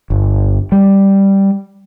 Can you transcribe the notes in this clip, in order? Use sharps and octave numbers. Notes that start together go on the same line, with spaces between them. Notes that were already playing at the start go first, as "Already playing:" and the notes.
G1
G3